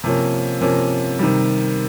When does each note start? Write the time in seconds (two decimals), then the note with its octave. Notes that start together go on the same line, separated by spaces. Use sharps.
0.04 C3 F3 A#3 C#4
0.61 C3 F3 A#3 C#4
1.19 C3 D#3 G3